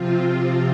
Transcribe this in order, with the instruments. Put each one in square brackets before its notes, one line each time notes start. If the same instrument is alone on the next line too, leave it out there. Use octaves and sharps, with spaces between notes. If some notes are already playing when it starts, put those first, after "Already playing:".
Already playing: [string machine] C3 F3 C4 F4